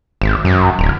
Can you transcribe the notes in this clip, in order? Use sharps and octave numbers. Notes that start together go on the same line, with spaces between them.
G#1
F#2
D1